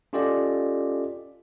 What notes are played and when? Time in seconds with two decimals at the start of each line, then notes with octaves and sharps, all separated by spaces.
0.13 C#4 F4 G4 A4 D5 D#5